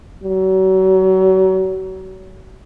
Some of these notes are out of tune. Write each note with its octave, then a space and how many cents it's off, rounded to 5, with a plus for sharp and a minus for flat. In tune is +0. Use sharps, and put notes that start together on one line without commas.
F#3 +35